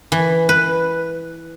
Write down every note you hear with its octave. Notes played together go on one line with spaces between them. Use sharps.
E3
B4